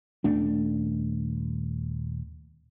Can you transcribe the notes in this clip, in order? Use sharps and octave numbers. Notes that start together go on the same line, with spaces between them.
D#1 A3 D4